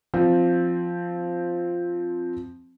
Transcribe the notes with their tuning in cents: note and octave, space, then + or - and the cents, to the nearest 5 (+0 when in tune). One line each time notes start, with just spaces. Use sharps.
F3 +0 C4 +0